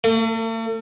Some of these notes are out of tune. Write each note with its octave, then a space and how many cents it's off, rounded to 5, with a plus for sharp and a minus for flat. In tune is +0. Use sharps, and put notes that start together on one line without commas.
A3 +45